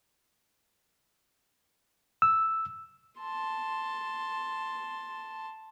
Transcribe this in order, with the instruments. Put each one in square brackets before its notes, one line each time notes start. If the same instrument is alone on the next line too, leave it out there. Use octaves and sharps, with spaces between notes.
[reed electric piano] E6
[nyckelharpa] A5 C6